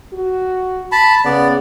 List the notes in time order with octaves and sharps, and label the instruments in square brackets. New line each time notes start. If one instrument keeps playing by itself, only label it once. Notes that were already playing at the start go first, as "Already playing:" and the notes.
[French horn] F#4
[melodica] A5 B5
[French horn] C#3 [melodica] B3 D5